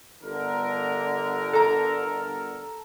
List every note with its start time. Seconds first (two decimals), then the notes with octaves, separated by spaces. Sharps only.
0.23 G1 D3 A#4
1.53 A4 A#5